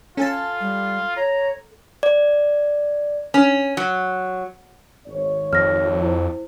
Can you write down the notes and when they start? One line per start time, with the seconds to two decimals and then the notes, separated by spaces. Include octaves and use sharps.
0.17 C#4 F4 A4 G#5 A5
0.60 G3
1.17 C#5 A#5
2.03 D5
3.34 C#4
3.77 F#3
5.07 G#1 C#5
5.53 F2 F6 A#6
6.02 E4 C5